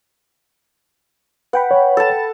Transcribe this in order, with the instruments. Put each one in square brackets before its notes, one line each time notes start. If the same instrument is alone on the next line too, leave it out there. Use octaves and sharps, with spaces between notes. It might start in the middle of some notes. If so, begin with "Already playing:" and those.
[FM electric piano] B4 G5 B5 [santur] F#5
[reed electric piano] C#5
[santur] A4 A5